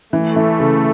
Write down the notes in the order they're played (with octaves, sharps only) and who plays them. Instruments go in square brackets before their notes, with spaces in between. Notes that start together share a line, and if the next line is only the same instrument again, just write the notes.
[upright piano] E3 [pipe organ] A3
[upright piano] E3
C#3